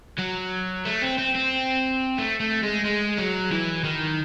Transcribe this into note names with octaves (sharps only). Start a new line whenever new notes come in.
F#3
A3
C4
C4
C4
A3
A3
G#3
G#3
F#3
E3
D#3